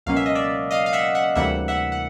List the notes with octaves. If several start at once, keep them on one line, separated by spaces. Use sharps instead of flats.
C#2 B2 F#3 A#3 C#4 F5
E5
D#5
D5 E5
D#5 F5
F5
E5 F#5
E5 F#5
D2 C3 E3 G3 A#3 E5 F#5
E5 F#5
F#5